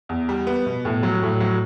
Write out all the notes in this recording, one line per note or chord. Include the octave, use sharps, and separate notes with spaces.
E2
G3
B3
B2
A2
F#3
A2
F#3